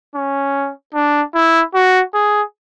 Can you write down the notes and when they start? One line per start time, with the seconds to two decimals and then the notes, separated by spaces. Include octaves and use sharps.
0.15 C#4
0.94 D4
1.34 E4
1.74 F#4
2.14 G#4